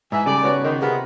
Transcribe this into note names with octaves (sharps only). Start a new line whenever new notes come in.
G#2 E3 D#4 E5 G#5
C#3 G3 A4 D5
B3 F#4 B4 C#5
D#3 C5
C3 B3 F4 G#4 A#4